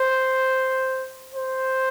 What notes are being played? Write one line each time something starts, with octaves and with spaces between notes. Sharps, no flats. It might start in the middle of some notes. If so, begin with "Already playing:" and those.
Already playing: C5
C5